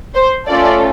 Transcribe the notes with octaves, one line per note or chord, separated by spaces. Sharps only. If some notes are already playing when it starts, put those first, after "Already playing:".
C5
A3 C#4 F4 A4 D5